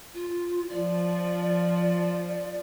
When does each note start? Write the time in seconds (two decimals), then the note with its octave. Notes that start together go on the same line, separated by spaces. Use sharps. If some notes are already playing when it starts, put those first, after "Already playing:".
0.14 F4
0.70 F3 D5